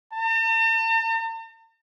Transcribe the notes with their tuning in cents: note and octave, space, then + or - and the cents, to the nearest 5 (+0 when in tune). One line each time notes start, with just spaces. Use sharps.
A5 +45